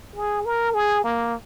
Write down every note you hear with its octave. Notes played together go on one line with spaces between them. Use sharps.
G#4
A#4
G#4
A#3